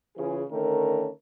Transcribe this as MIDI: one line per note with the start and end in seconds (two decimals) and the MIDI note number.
0.16 0.41 49
0.16 0.41 52
0.16 0.41 65
0.16 0.41 68
0.49 1.08 50
0.49 1.08 51
0.49 1.08 57
0.49 1.08 61
0.49 1.08 70